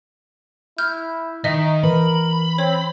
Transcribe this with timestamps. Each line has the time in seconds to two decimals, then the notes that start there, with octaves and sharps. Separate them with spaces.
0.78 E4 F6 G6
1.44 D#3 D#4 D#5 E5
1.83 E3 A#4 B5
2.58 C4 C#5